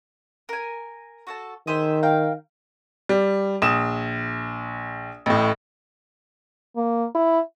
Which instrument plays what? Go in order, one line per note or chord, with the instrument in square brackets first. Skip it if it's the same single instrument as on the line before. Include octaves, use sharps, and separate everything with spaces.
[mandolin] A#4 G#5
F#4 A4 A5
[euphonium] D#3 [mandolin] G#4 C5 E5
[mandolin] A#4 F5 G5
[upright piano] G3
A#1 D#6 E7
A1 A2
[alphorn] A#3
E4